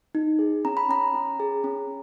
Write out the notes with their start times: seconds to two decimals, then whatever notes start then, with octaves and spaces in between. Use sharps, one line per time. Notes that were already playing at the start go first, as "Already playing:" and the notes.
0.15 D#4
0.39 G#4
0.65 C#4 A#5
0.77 B5
0.89 C#4 A#5
1.14 C#4
1.40 G#4
1.64 C#4